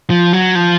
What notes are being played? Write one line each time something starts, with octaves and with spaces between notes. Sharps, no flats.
F3
F#3
F3